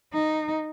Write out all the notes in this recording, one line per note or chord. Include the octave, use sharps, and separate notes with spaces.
D#4